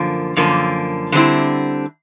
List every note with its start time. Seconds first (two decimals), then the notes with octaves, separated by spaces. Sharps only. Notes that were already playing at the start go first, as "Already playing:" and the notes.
Already playing: F#2 D3 F3 A#3
0.36 F#2 D3 F3 A#3
1.12 D3 G3 C4 E4